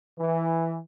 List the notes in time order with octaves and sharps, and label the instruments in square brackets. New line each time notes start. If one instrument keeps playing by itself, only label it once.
[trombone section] E3